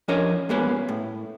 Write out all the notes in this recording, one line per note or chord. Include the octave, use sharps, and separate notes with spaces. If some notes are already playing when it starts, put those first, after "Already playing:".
F3 C#4 D4 A#4 C#5 D#5
G2 A#2 G#3 A#3 B3 C#4
A2